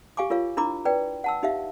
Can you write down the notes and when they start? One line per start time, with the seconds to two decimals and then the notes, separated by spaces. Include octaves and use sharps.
0.17 G4 F5 G#5 C#6 D6
0.30 F4 A#4 C#5 F5
0.57 D4 E4 A#4 A#5 B5 D6
0.85 B4 D5 G5
1.24 F#5 A5 E6
1.43 D#4 G4 E5 F5